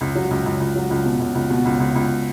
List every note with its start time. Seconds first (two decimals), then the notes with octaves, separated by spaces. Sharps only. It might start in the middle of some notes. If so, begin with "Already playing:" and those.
0.01 C#2
0.16 F#3
0.31 C#2
0.46 C#2
0.60 C#2
0.76 F#3
0.91 C#2
1.05 B2
1.20 C#2
1.35 C#2
1.50 B2
1.65 C#2
1.80 C#2
1.95 C#2